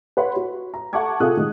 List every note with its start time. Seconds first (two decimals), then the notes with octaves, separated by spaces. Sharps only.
0.17 B4 C#5 F#5 B5 C6
0.36 F#4
0.74 A#5
0.93 A4 F#5 A5 C#6 D6 G#6
1.20 C3 F4 G#4 A4 D#6 F#6
1.37 D#3 G#3